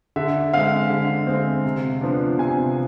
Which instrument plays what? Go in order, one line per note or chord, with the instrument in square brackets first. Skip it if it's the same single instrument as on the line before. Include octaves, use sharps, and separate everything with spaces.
[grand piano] D3 E5
G#3 C4 F5
D3
G#3 C4
C3
F3 B3 D4
C3 G#5